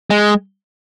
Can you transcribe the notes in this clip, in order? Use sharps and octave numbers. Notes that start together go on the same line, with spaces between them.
G#3